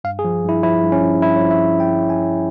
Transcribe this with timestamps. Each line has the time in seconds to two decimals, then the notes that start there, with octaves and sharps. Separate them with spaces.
0.04 G2 F5
0.19 G#4
0.24 F3
0.44 G2
0.49 E4
0.63 F3 E4
0.82 G2
0.92 C#4
1.02 F3
1.21 G2 E4
1.36 C#5
1.41 F3
1.51 E5
1.61 G2
1.80 F3 G5
2.00 G2
2.10 G#5
2.19 F3